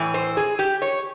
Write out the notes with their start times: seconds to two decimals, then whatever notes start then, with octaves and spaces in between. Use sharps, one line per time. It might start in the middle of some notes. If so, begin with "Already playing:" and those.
Already playing: A2 E3
0.14 C5
0.37 G#4
0.59 G4
0.82 C#5